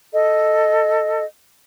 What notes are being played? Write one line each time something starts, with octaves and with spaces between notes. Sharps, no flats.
A4 D#5